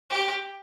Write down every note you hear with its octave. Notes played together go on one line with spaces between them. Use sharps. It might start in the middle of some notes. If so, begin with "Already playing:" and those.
G4